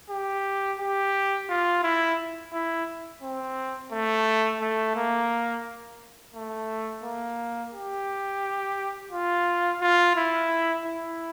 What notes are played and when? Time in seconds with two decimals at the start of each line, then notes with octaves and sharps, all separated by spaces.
0.10 G4
0.80 G4
1.49 F4
1.83 E4
2.53 E4
3.23 C4
3.92 A3
4.61 A3
4.96 A#3
6.34 A3
7.04 A#3
7.74 G4
9.11 F4
9.81 F4
10.16 E4
10.85 E4